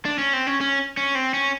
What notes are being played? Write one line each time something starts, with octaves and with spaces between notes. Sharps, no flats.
D4
C#4
C4
C#4
C#4
C#4
C4
C#4